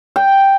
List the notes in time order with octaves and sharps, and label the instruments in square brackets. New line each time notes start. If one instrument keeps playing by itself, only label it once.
[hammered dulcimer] G5